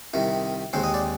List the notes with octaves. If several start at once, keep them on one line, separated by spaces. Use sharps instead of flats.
C2 C3 D#3 A#4
D#2 D#3 G#3 C4 C5
D#5
D5